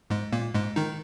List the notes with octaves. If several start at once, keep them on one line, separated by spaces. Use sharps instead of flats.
G#2 G#3
A#2 A#3
G#2 G#3
D#3 D#4